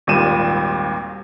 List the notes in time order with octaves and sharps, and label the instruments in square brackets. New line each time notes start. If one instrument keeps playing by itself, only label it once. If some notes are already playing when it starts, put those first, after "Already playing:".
[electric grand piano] G#1 D#2 A#2 G3 D#7 E7